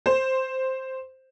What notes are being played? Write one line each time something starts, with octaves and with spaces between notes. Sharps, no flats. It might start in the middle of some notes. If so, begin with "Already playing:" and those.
C5